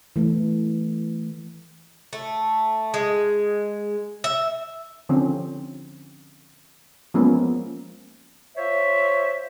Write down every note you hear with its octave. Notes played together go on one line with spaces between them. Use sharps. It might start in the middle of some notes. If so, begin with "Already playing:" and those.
E3 A3
A3
G#3
E5
D3 F3 C4 C#4
F3 G#3 A#3 B3 C#4
F4 C5 C#5 E5